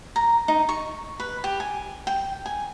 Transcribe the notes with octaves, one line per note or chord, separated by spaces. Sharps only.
A#5
D#4
C#6
B4
G4
G#5
G5
G#5